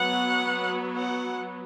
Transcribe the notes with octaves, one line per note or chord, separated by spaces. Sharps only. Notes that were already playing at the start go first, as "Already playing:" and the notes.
Already playing: F#3 B3 F#5
F#5